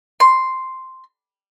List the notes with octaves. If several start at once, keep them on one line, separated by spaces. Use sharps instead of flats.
C6